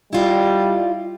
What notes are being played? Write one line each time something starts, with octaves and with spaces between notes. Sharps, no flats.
G3 E4 F4 D#5